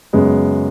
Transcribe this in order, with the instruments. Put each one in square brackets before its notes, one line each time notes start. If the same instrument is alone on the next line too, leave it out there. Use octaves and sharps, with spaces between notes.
[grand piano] F#2 C#3 G#3 B3